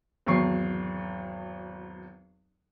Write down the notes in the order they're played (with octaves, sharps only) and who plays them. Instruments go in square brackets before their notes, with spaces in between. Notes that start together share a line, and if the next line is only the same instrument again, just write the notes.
[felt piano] G#1 E2 F#3 C#6 C7